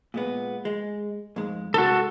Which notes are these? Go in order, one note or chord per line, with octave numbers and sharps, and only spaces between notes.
A#2 G#3 B3
G#3
F2 G#2 G#3
C2 C3 G#3 F#4 A4